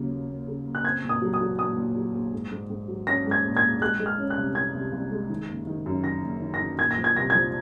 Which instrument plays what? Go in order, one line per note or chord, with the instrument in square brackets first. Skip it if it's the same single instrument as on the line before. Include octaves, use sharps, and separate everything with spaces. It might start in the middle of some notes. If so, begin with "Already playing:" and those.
Already playing: [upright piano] D#2 C#3 F#3 A#3
A#3
A#3
C#3
A#3
[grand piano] F#6
[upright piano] C4 [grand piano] G#6
[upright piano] A#2
[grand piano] D#6
[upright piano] F#3
[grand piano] D#6
[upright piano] F#3
[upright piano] A#2 [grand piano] D#6
[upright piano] A#2
F#3
A#1
G#2
G#2
G#2
F#3
[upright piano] C#4 [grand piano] A#6
[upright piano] G#2
[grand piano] G#6
[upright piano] A#1
[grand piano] G#6
[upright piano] A#1
[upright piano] G#3 [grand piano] F#6
[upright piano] G#3
[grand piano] F6
[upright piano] C#4
[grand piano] F#6
[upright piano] C2
[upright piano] C#4 [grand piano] G#6
[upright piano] C2
C2
G#3
D#3
F#1
D#3
F#2
[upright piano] D#3 [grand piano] A#6
[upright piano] F#1
D#3
[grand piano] A#6
[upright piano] D#3
[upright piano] A#2 [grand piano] G#6
[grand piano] A#6
[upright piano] F3
[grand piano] G#6
[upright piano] C2 [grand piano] A#6
[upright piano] F3 [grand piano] G#6